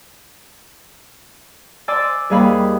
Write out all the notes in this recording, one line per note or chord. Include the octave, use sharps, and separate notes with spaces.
D5 G#5 C6 D6 E6
D#2 G3 G#4 F5 B5